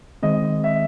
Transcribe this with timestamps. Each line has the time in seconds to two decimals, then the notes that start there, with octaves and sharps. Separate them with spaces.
0.23 D#3 G#3 C4 D#5
0.64 E5